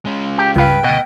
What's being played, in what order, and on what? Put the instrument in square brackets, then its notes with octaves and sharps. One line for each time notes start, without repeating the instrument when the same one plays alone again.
[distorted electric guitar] G#3 C#4
[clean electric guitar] G4
[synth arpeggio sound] C#2 F5 [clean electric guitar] G2 B4 [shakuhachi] G5
[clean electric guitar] D2 B2 [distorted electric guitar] D#5 [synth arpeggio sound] F#5